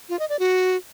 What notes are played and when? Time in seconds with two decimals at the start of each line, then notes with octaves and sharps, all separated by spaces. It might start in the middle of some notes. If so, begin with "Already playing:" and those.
0.09 F4
0.19 D#5
0.29 D5
0.39 F#4